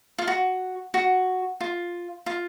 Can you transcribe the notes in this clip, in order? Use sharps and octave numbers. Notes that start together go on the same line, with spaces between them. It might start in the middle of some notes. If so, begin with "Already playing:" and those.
F4
F#4
F#4
F4
F4